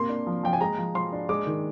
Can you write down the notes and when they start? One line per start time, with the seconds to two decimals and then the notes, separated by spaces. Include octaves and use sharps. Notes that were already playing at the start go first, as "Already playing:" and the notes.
Already playing: C3 A#3 C6
0.09 D4
0.27 F3
0.43 F3 G5
0.53 G#5
0.61 G#3 A#5
0.78 F3
0.95 F3 C6
1.13 D4
1.29 G#3 D6
1.46 D#3